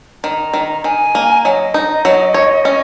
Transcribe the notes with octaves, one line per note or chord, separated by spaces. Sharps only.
D#3 A#5
D#3
D#3 G#5
A#3
F#3 D#5
D#4
F#3
C#5
C#4